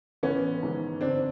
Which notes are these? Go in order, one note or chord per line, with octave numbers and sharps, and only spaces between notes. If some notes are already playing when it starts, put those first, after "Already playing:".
A1 B3 C#4
G#2 D#3
G1 C4 D4